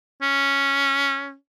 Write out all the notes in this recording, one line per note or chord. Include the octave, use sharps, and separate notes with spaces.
C#4